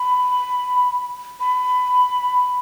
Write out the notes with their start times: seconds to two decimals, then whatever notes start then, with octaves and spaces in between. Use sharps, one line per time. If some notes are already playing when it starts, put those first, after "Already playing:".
Already playing: B5
1.40 B5